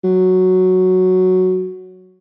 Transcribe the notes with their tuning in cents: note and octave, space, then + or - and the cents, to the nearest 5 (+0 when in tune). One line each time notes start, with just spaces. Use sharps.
F#3 +0